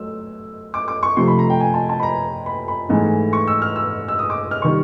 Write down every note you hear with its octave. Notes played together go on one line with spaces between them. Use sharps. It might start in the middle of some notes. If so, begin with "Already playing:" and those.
Already playing: F#3 A3 E6
D6
D6
C#6
C3 F3 A3 C6
B5
A#5
G5
G#5
A5
A5
B5
A#5
B5
B5
G#2 E3 A3
C#6
E6
F6
E6
E6
D#6
D6
F6
D#3 G3 C#6